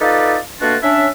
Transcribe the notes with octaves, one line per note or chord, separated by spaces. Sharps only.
D#4 F4 A4 B4 D5
B2 A3 A#3 D4 F4 F#4
C#4 D4 E5